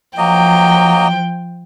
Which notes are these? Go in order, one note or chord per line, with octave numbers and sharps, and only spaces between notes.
F3 F#3 A#3 D#5 G5